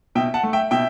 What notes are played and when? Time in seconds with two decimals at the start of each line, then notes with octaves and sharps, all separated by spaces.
0.15 B2 E5 G5
0.34 F#5 A5
0.43 A3
0.53 E5 G5
0.71 B2 E5 G5